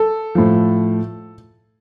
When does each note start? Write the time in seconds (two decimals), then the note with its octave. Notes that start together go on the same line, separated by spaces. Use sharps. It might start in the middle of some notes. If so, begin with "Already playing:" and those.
Already playing: A4
0.35 A2 F3